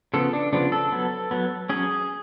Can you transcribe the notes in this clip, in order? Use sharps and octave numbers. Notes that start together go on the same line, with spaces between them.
C#3 F3 B3 A4
D4
C#3 F3 B3 D4
A4
F#3 B3
F#3 B3
F#3 C#4 G#4